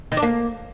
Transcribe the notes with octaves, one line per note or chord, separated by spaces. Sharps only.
D#3
D4
A#3